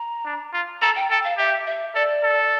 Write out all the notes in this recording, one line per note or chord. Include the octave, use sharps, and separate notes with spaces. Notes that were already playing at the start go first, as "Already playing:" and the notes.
Already playing: A#5
D4
F4
A4 A#5
G5
A4 G5
F5
G4 E5
E5
A4 D5
A4